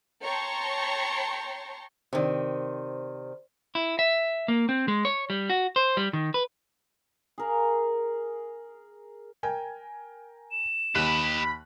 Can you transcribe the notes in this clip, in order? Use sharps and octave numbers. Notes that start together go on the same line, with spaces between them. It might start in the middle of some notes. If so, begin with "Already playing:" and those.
C#5 G5 A5 A#5 C6 C#6
C3 D#3 C5 D5
E4
E5
A#3
C4
G#3
C#5
G3
F#4
C5
G3
D#3
B4
G#4 A#4 F5
A#4 G5 G#5
E7
D#2 G4 D#5 B5 F#6